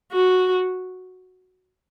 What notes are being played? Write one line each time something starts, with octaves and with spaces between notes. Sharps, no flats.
F#4